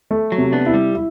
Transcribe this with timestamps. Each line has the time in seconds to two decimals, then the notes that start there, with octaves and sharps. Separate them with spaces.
0.11 A3
0.32 F#3
0.38 C3
0.53 B3 D4
0.66 E4
0.74 G3
0.95 E4